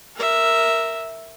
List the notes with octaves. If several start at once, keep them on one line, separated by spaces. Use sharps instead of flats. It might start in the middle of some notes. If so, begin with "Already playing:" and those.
A#4 E5